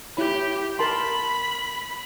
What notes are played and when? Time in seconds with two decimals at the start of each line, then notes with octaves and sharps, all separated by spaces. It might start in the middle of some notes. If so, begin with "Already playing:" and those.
0.17 E4 G4 C#5 B5
0.79 A#4 A5 B5 C6